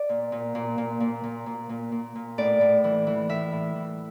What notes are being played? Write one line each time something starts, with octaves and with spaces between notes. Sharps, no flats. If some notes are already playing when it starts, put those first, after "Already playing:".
Already playing: D5
A#2
A#2
A#2
A#2
A#2
A#2
A#2
A#2
A#2
A#2
A2 D5
A2
E3
E3
A2 E5
A2
E3